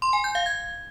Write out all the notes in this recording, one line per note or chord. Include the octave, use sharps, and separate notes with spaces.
C6
G#5
G6
F5
G#6